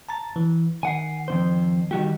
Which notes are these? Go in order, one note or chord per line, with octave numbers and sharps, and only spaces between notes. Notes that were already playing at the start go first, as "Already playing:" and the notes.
A5 A#5 A6
E3
D#3 F#5 G#5 C7
F2 C3 C5
D#3 G3 F#4 G4